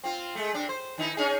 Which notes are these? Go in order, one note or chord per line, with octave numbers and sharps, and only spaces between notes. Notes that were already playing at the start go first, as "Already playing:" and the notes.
C4 F4
G#3 A3
C3 D4
C5
D#3 D#4 E4
C#4 D#4 G#4